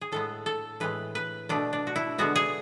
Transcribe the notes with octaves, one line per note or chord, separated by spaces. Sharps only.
G#4
A2 G#3 B3 A4
A4
A2 E3 G#3 B4
B4
B2 A3 D4
D4
F#4
E4
D3 G#3 B3 F#4
G#4